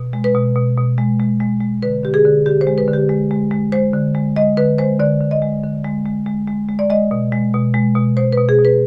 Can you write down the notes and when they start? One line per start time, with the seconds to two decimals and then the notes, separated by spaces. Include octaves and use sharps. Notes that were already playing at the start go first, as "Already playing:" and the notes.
Already playing: B2
0.13 G#3
0.24 B4
0.35 B2
0.56 B2
0.77 B2
0.98 G#3
1.19 G#3
1.40 G#3
1.61 G#3
1.83 D3 B4
2.03 D3 G4
2.14 G#4
2.25 D3
2.46 D3 G4
2.61 C5
2.67 G#3
2.78 B4
2.88 D3
2.93 G4
3.09 G#3
3.31 G#3
3.51 G#3
3.72 G#3 C5
3.93 D3
4.15 G#3
4.36 G#3 D#5
4.57 D3 B4
4.78 G#3 C5
5.00 D3 D5
5.20 D3
5.31 D#5
5.42 G#3
5.63 D3
5.84 G#3
6.06 G#3
6.26 G#3
6.47 G#3
6.69 G#3
6.79 D5
6.90 G#3 D#5
7.11 B2
7.32 G#3
7.54 B2
7.74 G#3
7.96 B2
8.17 B2 C5
8.33 B2 B4
8.49 G#4
8.59 B2
8.65 B4